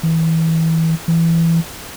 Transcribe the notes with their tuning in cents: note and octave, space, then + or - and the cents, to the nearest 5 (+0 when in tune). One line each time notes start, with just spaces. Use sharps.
E3 -25
E3 +10